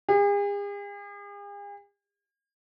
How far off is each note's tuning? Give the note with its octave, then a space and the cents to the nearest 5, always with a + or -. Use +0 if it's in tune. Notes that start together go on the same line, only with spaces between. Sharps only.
G#4 -45